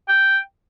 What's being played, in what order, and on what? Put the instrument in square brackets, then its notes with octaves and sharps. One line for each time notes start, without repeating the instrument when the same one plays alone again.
[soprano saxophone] G5